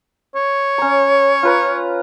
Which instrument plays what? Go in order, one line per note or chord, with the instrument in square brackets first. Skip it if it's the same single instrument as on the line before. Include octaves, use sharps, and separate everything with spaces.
[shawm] C#5
[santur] C#4 A#5
F4 B4 A#5